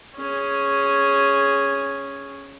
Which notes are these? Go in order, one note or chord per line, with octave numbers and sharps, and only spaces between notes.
C#4 G#4